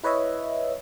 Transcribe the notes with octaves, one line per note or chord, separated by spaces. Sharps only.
E4 B4 C#5 D#5 E5